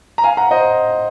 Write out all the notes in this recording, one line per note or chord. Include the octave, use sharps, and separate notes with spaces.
A#5
F5 G#5
F#5 A#5
C5 D#5